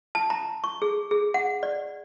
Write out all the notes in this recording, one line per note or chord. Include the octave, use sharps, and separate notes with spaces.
A5
A#5
C#6
G#4
G#4
F#5
D5